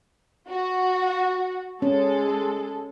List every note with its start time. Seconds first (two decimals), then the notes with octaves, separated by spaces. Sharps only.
0.49 F#4
1.82 G#3 C#4 A4